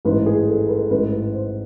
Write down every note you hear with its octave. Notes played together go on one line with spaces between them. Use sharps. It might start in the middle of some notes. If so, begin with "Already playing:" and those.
A1 G#2 E3 B4
G#4
A4
B4
A1 G#2 E3 B4
C5